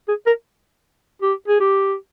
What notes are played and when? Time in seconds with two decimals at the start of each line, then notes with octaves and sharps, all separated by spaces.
0.08 G#4
0.26 A#4
1.22 G4
1.48 G#4
1.60 G4